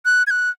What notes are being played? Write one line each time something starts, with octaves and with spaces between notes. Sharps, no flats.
F#6
G#6
F#6